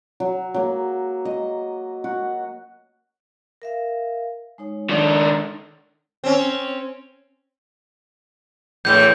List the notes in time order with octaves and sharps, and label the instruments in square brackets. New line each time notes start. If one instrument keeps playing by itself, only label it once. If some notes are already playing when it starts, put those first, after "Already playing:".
[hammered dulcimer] F#3
F#3 A#3
D#5
F#4
[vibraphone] A#4 E5 F5
G#3 D#4 C#5
[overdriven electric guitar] D#3 D4
[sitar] C4 C#4
[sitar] E2 A2 E3 [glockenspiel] G6